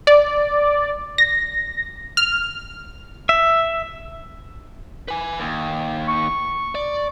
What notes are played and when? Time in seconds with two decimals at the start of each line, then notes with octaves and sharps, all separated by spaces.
0.07 D5
1.18 A#6
2.17 F6
3.29 E5
5.08 B4 G#5
5.40 D#2
6.08 C#6
6.75 D5